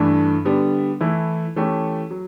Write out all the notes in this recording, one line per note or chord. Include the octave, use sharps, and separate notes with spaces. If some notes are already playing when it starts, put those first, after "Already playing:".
Already playing: G2 E3 A3 D4
D3 G3 B3 D4
E3 A3 E4
E3 A3 C#4 G4
F#3